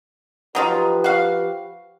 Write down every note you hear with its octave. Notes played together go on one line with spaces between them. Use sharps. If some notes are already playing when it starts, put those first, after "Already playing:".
F3 F#3 D#4 F4 G4 B4
F#4 F5